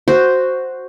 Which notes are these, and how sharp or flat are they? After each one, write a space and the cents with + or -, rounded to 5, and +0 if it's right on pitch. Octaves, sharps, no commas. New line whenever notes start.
F#4 +0 C5 +0